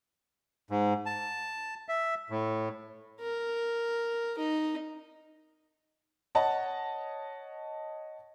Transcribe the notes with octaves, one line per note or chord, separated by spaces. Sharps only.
G#2
A5
E5
A2
A#4
D#4
C#5 D#5 F#5 A5